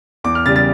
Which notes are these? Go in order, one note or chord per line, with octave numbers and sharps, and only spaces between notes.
E2 D6
F6
C#3 G3 A6
A6